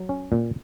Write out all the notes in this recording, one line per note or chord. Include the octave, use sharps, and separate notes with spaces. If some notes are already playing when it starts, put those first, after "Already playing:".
Already playing: F#3
C#4
A#2